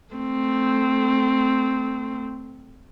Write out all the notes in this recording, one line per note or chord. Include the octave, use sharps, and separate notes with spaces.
A3 C4